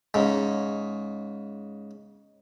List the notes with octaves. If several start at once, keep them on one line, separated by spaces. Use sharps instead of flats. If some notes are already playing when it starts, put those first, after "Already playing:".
G#2 C#3